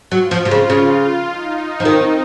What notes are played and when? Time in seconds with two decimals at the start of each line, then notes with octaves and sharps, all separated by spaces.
0.11 F#3 F4
0.31 F3
0.45 C3
0.51 C#3
0.70 C#3 F4
1.28 D#4
1.80 F3
1.85 D#3 C4